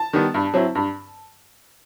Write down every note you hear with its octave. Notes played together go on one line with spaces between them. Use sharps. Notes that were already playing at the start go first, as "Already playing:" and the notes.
Already playing: A5
D#3 G3 B3
G2
F#3 C4 E4
G2